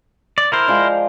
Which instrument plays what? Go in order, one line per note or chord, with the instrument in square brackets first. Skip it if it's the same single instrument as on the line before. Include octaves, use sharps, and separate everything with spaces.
[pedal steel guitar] D5
[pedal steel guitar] E4 A#4 C5 [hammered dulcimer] G5
[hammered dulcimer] F3 G#3 D5